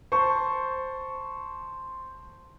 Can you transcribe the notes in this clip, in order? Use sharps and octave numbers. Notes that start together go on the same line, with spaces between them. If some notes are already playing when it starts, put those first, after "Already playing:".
C5 A5 C#6